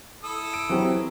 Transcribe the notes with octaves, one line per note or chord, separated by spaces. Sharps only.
E4 A4 D#6
D7
E3 F#3 C4 G4